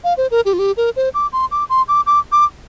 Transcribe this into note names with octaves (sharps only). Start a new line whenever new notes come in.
F5
C5
A#4
G4
F4
G4
A#4
C5
D6
C6
D6
C6
D6
D6
D6